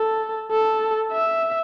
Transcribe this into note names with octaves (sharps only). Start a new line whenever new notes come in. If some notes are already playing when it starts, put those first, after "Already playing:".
Already playing: A4
A4
E5